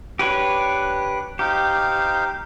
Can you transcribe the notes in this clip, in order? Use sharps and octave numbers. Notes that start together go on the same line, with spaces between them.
D4 G4 B4 C#5
D#4 G4 C5 F5